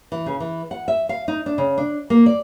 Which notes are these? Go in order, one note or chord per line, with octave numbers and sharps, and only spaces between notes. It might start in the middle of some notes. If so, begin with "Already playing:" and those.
E3
C#3
E3
F#5
E5
F5
D#4
D4
C#3
D4
A#3
D5